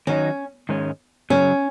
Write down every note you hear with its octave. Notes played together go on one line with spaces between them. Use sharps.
D#3 F#3 C#4 D#4
G#2 D#3 G#3 C#4
F#2 C#3 F#3 C#4